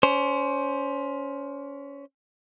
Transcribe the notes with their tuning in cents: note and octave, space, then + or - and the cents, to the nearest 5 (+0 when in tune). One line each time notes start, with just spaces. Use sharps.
C#4 +25 C5 +5